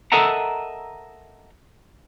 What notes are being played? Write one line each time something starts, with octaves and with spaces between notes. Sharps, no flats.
A4 A#4 D#5 E5 F#5 A#5